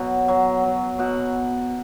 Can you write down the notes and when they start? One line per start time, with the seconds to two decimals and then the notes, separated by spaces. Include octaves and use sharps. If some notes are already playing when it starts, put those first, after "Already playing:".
Already playing: B2 F#3
0.28 F#3
0.64 F#3
0.99 B2 F#5